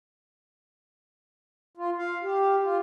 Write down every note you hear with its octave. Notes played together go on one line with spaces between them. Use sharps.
F4
F5
G4
F4